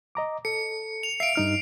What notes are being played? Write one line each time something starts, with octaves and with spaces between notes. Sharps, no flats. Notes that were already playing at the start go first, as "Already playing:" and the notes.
D#5 A#5 D6
A4 C#7
F7
E5 F5 C7 D7
G2 D#4 F6